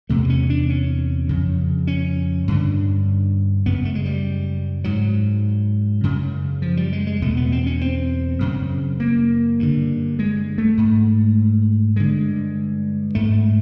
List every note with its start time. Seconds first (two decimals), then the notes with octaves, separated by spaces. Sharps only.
0.09 E2 C3 A3
0.29 C#4
0.50 D4
0.70 C#4
1.29 F2 C#3
1.87 C#4
2.48 G2 D3
3.66 F#2 C#3 B3
3.85 A3
3.95 G#3
4.06 G3
4.84 G#2 F#3
6.03 F#2 C#3
6.62 F3
6.77 G3
6.92 G#3
7.07 G#3
7.22 E2 B2 A3
7.37 B3
7.52 C4
7.66 C#4
7.81 C4
8.40 F#2 C#3
9.00 A#3
9.59 G2 D3
10.19 G#3
10.58 A3
10.77 G#2
11.96 G2 D3 G#3
13.15 G#2 A3